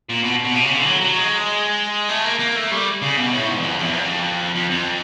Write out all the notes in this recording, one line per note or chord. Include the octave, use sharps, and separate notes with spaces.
A#2
B2
B2
C3
C#3
D3
F#3
F#3
G#3
A3
A#3
A#3
A3
G3
C#3
B2
A2
G#2
E2
F2
E2
F2
F2
F2